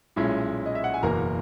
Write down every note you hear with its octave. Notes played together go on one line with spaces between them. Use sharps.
B1 A#2 G#3 C#4 E4
D#5
E5
F#5
G#5
F#1 E2 B2 A#3 A#4 A#5